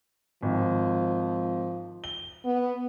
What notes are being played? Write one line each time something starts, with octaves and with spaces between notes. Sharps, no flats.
G#1 F3
G7
B3